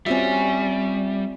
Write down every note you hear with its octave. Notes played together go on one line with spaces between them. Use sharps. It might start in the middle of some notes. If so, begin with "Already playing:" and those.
G3 C4 C#4 F4 F#4 E5